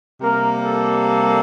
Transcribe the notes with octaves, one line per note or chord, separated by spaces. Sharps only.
C3 G3 A#3 A#4
A4